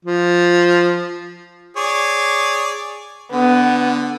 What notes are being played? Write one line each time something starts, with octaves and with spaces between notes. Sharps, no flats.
F3
G#4 C#5 D5
D3 B3